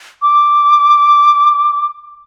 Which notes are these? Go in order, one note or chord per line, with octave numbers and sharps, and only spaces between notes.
D6